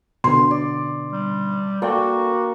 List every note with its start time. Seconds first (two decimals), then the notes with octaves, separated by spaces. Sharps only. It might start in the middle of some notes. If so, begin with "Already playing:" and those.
0.24 B2 D3 C6
0.51 D5
1.13 G3
1.82 A#3 F#4 A4 D5 G5